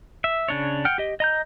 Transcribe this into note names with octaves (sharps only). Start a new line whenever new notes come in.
E5
C#3 D4 C#5
F#5 G5 F6
G4 D#5
D#5 A#5 G6